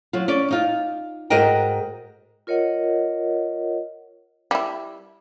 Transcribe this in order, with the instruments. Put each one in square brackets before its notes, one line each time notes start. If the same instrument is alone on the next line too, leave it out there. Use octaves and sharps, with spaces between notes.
[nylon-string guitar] F#3 F4
C#4 D5
D#4 F4
G#2 F#4 G#4 A#4 D#5 G5
[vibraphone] F4 A#4 C#5 D#5 F#5
[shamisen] G3 E4